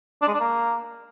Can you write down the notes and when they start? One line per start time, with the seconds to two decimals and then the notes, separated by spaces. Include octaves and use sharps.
0.22 D4
0.28 G#3
0.34 D4
0.40 A#3